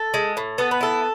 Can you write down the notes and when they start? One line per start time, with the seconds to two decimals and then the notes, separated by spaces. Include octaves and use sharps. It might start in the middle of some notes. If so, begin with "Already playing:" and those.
Already playing: A4
0.14 G#3
0.37 A2
0.58 B3 A4
0.71 B4
0.81 E4 A4